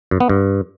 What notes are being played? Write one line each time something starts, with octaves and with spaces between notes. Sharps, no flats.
F#2
B3
G2